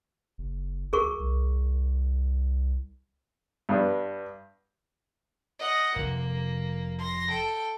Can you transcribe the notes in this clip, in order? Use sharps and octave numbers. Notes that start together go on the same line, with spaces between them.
F#1
D2 G#4 A#4 C#6
C2
G2 B3 D4
D#5 F#5
F1 C3 A#3
C6 A#6
A4 G5